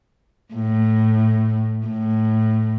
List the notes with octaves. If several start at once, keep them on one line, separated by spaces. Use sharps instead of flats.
A2
A2